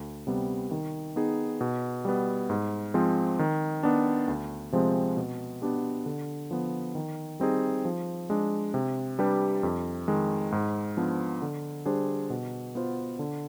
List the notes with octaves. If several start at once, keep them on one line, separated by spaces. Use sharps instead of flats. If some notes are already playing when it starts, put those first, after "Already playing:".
Already playing: D2
C3 G3 B3
D#3
B3 D#4 G#4
B2
G3 B3
G#2
F3 G#3 C4
D#3
B3 D4
D2
C3 F3 G#3 C4
B2
B3 D4 G4
D3
F3 B3
D#3
G3 C4 D#4 G#4
F3
G#3 D4
C3
G3 D4 G4 B4
F2
D#3 G#3
G#2
F3 B3 D4
D3
G3 D4 G#4 C5
B2
B3 F4 C5
D3